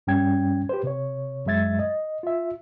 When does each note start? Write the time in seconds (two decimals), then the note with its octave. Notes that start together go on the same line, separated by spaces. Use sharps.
0.07 G2 G3 C#4 G5 G#6
0.69 G4 B4 C5
0.84 C3 C#5
1.46 F#2 F#3 G#3 E5 G#6 A6
1.79 D#5
2.23 F4 E5